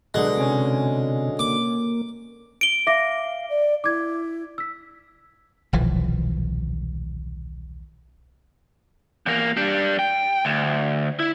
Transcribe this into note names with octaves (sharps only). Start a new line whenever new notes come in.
B2 D3 F#3 G#3 D4 A#4 F#6
C3 C#4 G#5 D7
A#3 D6
D7 G7
E5 F5 D6 A#6
D5
E4 D6 G#6
E6 B6
D#1 B1 E3 F3
E2 A#3
G3 D4
G5
D2
E4